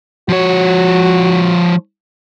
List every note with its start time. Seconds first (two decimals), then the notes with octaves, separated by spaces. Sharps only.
0.29 F3 F#4 C#5